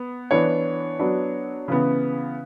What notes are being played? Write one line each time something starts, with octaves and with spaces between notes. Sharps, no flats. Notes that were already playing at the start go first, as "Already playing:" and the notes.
Already playing: B3
E3 B3 D4 C#5
F#3 B3 D4
C#3 E3 B3